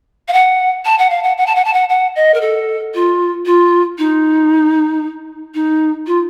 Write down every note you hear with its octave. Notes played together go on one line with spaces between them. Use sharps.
F5
F#5
A5
F#5
F5
F#5
F#5
A5
F#5
A5
F#5
F#5
D#5
A#4
A4
F4
F4
D#4
D#4
F4